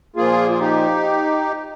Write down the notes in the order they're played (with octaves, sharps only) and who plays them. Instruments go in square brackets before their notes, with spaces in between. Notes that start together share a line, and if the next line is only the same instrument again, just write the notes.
[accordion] A#2 F3 A#3 F4 G#4
F4
D#4 G4